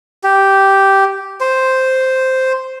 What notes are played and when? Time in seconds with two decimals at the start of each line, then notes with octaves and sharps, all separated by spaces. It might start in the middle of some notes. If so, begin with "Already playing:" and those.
0.24 G4
1.41 C5